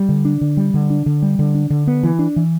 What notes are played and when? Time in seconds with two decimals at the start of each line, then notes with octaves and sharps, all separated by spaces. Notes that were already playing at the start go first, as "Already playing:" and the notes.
Already playing: G3
0.09 D3
0.25 D4
0.41 D3
0.57 G3
0.74 D3
0.90 D4
1.06 D3
1.22 G3
1.39 D3
1.55 D4
1.70 D3
1.87 B3
2.03 E3
2.19 D4
2.36 E3